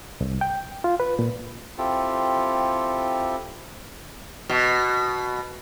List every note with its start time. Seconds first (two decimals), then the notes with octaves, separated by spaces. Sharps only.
0.21 C2
0.41 G5
0.84 F4
1.00 B4
1.19 A#2
1.78 C4 E4 F4 G4 A4
4.49 B2